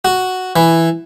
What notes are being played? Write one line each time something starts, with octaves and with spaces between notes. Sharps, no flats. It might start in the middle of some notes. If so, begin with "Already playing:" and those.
F#4
E3